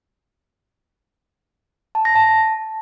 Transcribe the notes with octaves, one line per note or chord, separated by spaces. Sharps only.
A5
A#6
A5